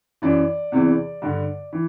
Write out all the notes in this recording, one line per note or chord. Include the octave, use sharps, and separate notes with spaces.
F#2 E3 D5
E2 C3 E3
G2 D3
E3